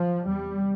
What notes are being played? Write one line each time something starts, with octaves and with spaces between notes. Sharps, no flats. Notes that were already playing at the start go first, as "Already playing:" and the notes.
Already playing: F3
E2 C3 G3